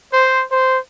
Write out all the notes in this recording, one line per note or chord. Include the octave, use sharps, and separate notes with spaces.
C5
C5